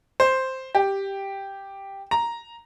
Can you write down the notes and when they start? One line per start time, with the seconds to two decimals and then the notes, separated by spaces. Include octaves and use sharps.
0.20 C5
0.75 G4
2.11 A#5